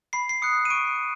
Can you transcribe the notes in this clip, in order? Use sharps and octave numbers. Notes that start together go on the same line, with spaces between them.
B5 C7
C7
D#6 F#6 C#7
D#7
C#6 D7